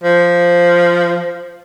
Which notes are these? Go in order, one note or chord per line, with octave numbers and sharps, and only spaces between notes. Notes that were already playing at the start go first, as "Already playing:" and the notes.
F3